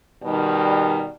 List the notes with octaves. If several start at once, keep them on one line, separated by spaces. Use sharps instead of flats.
B2 D#3 G3